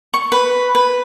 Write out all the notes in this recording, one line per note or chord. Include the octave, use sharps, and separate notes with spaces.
C#6
B4
B4